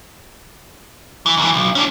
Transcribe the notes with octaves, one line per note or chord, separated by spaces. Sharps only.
E3
D#2 E3
B1
C#4 D4